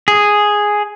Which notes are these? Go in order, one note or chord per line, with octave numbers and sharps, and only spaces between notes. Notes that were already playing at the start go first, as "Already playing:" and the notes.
G#4